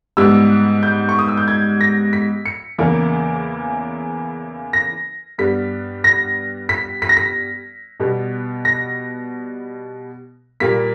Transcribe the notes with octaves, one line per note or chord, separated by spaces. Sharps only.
G#2 G3 B3 E6
G6
C#6
D#6
E6
G6
G#6
A#6
B6
C#7
E2 C#3 E3 A#3
A#6
G2 G3 B3 B6
A#6
B6
B6
A#6
B6
B2 G3 B3
A#6
A#2 G3 A#3 B6